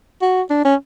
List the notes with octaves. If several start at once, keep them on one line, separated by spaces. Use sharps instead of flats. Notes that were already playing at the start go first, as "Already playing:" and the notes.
F#4
D4
C#4